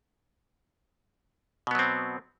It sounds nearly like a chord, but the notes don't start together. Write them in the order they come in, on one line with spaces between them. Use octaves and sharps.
B2 B3 F#3 C4